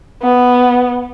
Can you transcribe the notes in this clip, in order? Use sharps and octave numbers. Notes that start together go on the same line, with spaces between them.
B3